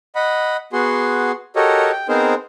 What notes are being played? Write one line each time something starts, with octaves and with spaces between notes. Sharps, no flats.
D#5 F#5 B5
B3 F#4 G#4 C6
F#4 G4 A4 A#4 C#5 D#5
G5
B3 C4 D#4 G#4 A#4 C5